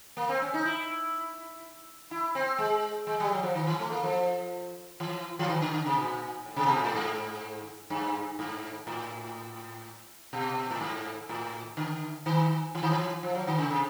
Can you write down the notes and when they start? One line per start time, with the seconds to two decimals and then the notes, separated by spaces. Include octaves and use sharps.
0.17 A#3
0.29 C4
0.42 C#4
0.54 D#4
0.65 E4
2.11 E4
2.35 C4
2.58 G#3
3.07 G#3
3.20 G3
3.32 F#3
3.43 F3
3.56 D#3
3.67 E3
3.79 A3
3.92 A#3
4.03 F3
5.00 E3
5.39 E3
5.49 D#3
5.61 D3
5.74 D3
5.86 C3
5.97 A#2
6.45 A2
6.56 C3
6.66 B2
6.76 A#2
6.84 A2
6.95 G#2
7.90 G2
8.39 G#2
8.87 A2
10.33 B2
10.71 A2
10.81 G#2
11.29 A2
11.77 D3
12.26 D#3
12.75 E3
12.82 D#3
12.91 E3
13.23 F3
13.35 F#3
13.47 D#3
13.58 C#3
13.71 C3